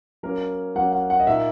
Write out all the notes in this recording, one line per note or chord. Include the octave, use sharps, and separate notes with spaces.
F#3 A#3 C#4 A#4
F#3 A#3 C#4 F#5
F#5
F#5
D#5
A#2 A#3 D#4 E5